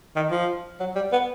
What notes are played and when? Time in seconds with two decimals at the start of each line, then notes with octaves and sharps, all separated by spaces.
0.16 D#3
0.31 F3
0.80 F#3
0.95 G3
1.13 B3